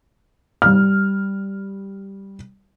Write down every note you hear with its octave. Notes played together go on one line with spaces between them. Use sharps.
G3 F6